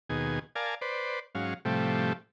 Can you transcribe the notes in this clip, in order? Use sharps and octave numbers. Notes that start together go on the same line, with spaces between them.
D#2 B2 G#4
A#4 D5 F5 G#5 A5
B4 C5 D5
G#2 F#3 C#4 F5
A2 C3 F3 G3 A3